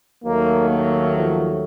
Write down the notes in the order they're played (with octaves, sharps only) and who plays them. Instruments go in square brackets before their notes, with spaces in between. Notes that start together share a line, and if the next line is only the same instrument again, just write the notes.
[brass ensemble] D#2 D#3 F#3 A3 [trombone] A#3
[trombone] A#3
F3